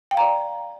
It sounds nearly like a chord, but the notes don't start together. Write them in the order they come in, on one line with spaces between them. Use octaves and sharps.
G5 F5 A#5 D5